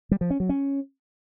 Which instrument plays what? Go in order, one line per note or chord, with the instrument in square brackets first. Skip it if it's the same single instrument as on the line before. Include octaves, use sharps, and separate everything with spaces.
[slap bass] G3
F3
C#4
F#3
C#4